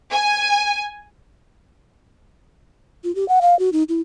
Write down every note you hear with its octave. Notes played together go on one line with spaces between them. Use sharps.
G#5
F4
G4
F#5
F5
F#4
D#4
E4